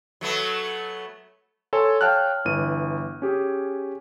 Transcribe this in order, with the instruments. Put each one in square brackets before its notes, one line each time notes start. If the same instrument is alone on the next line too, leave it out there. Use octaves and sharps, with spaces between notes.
[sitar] F#3 A3 B3
[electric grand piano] A4 C#5 G#5 A5 C6
C#5 F5 G5 A5 F6 F#6
G1 E3 D#7
C#4 G4 G#4